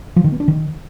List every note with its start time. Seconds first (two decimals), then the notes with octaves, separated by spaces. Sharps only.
0.16 F3
0.24 D#3
0.32 B3
0.40 D4
0.48 D#3